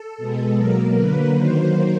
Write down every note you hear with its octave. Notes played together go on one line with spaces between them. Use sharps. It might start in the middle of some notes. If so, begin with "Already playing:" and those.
Already playing: A4
B2 G#3 B3
B2 F#3 A#3 A#4
D3 F#3 A#3 B4
D#3 F#3 A#3 C5